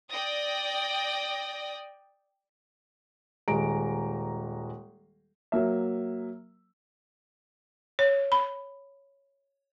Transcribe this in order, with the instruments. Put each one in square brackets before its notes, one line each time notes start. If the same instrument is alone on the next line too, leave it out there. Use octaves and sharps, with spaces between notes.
[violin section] D5 G5 D#6 A#6
[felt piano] D#1 G#3 A#5 D7
[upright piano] F#3 A#3 E5
[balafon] C#5
B5